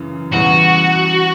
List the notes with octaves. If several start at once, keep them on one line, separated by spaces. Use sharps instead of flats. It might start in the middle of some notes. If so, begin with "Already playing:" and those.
Already playing: F#2 C#3 E3
E2 C#3 E3 G3 F#4